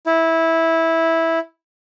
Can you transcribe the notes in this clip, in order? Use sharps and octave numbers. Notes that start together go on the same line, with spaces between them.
E4